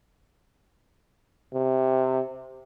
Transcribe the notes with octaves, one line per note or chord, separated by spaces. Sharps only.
C3